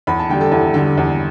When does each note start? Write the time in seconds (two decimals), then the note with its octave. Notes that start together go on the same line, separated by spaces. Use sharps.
0.07 E2 B5
0.19 A5
0.29 D3 G3 G5
0.41 A4
0.52 E2 E4
0.74 D3 G3
0.98 E2